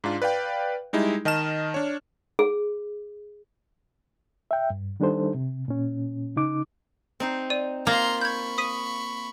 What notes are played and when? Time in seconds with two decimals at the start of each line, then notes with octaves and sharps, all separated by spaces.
0.04 G#2 D4 F4
0.22 B4 D5 F5 G5
0.93 G3 G#3 D#4 E4
1.25 D#3 D#5 A5 F6 E7
1.74 D4 C#5
2.39 G#4
4.51 E5 G5
4.70 G2
5.00 D#3 G3 D4 D#4 A4 C5
5.35 C3
5.68 A#2 C#4
6.36 C#3 D#4 D6
7.20 C4 D#4 C5
7.50 D5 D#7
7.87 A#3 F4 A#5 C6
8.21 B5 C#6 G6 G#6
8.58 D#6 B6 D#7